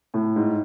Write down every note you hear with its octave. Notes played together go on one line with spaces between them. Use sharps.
A2
G#2